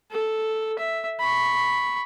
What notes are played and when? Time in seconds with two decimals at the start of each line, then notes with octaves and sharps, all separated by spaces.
0.11 A4
0.79 E5
1.20 B5 C#6